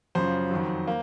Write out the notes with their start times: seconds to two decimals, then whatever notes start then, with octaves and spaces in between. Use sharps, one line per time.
0.15 F#2 C#3 F3 C5
0.51 F2 D#3 F#3
0.87 A#3